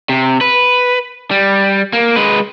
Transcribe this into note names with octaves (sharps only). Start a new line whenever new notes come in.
C3
B4
G3
A#3
G#3 B4